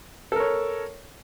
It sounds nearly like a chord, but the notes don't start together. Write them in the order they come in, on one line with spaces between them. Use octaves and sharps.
A4 A#4 C#5